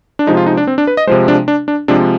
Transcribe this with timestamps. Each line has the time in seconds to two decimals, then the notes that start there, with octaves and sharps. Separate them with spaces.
0.19 D4
0.27 C3 F3 G#3 D#4
0.37 F4
0.46 D#4
0.57 D4
0.67 C4
0.78 D4
0.87 B4
0.97 D#5
1.07 C3 F3 G#3 C5
1.28 D4
1.48 D4
1.68 D4
1.88 C3 F3 G#3 D4